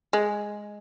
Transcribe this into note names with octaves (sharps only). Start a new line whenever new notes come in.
G#3